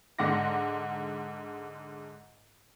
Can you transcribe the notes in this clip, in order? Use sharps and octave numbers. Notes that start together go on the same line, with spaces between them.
G#2 D3 F#5 C6 D6 A#6